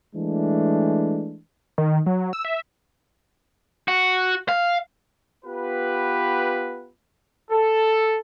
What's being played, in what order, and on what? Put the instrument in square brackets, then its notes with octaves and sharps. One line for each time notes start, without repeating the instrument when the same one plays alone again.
[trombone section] E3 G#3 A3 D4
[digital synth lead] D#3
F#3
E6
E5
[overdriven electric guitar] F#4
F5
[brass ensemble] B3 F4 G4 B4
A4